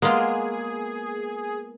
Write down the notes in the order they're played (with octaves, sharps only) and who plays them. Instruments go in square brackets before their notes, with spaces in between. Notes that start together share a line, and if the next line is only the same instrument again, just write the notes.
[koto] G#3 F4 [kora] A#3 B3 [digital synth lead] G#4 [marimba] F5 F#5 D#6